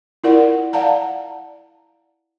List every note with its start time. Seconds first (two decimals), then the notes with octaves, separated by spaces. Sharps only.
0.24 E4 F4 A#4 D5 F#5
0.73 D5 F5 F#5 A5 A#5